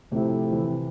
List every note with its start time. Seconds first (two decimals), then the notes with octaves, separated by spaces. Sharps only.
0.12 A2 C3 F3 A3 E4 G4
0.52 C3 E3